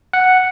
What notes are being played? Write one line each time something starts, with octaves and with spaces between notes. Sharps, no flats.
F#5